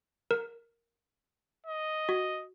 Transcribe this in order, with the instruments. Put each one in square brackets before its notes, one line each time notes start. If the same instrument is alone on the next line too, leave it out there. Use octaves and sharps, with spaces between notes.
[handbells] A#4
[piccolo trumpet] D#5
[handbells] F#4